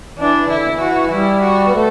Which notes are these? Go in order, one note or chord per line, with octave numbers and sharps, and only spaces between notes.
E3 D4
C#3
D3 E4
B2
D3
E3
F#4
G3 E4
F#4
B3
A3